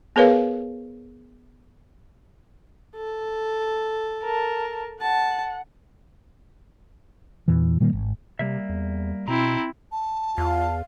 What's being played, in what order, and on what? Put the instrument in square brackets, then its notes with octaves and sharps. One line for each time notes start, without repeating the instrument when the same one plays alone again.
[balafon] B3 G#4 A#4 B4 C#5 F5
[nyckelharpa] A4
[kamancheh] A#4 A5
[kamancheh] F#5 [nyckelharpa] A5
[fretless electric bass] E2 A#2 E3
A#2 D#3 G3 A#3
G#1
[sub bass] C3 [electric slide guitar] G3 A#3 E5
[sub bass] E2
[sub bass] B2 [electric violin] C4 E4 [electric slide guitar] A#5
[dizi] A5
[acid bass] E2 [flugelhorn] F4 [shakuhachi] F5